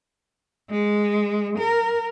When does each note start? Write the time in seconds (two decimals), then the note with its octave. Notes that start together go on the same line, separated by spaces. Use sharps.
0.70 G#3
1.58 A#4